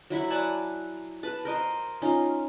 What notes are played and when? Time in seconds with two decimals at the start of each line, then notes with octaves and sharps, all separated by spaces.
0.10 F#3 E4 B5 C#6
0.30 D5 F#5 G#5 A5
1.23 B4 A5
1.45 A#4 C5 D#5
2.02 C#4 D#4 F4